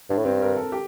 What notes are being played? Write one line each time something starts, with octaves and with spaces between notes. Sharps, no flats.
G2 D4
A2
G2 C4
A#4
A4
G4